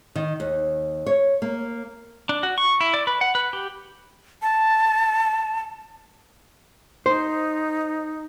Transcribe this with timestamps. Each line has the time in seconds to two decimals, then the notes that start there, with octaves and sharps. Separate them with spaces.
0.15 D#3
0.40 D#2
1.06 C#5
1.42 A#3
2.29 D4
2.43 F#4
2.58 C#6
2.81 E4
2.94 D5
3.07 B4
3.21 F#5
3.35 B4
3.53 G4
4.42 A5
7.06 D#4 C5